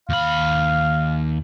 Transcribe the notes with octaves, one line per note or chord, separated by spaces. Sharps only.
D#2 F5 B5